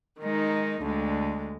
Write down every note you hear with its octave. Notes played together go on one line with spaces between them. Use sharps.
D#3 G#3 D#4
D2 D3 G#3